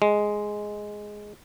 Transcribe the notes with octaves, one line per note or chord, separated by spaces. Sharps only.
G#3